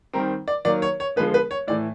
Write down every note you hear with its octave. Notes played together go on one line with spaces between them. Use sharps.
D#3 G3 C4 A#4
D5
D#3 F#3 A#3 D5
C#5
C#5
D3 F3 G#3 B3 B4
B4
C#5
A2 E3 A3 D5